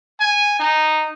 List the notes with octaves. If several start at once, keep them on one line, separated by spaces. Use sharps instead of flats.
G#5
D#4